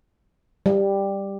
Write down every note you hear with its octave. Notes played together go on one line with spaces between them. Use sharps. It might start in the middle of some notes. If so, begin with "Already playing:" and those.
G3